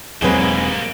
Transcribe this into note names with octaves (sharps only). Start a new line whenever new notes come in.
E1 G#2 F#3 G3 A#3 C4 G#4 B4